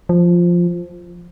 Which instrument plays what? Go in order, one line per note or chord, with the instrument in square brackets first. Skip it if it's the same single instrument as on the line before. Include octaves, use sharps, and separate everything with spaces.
[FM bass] F3